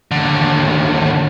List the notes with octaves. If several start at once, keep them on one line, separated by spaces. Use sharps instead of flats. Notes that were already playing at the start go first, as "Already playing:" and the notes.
D#2 D3